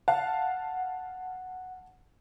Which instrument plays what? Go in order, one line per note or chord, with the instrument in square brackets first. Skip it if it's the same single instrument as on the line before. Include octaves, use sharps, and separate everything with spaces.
[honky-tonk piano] F5 A5 [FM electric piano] F#5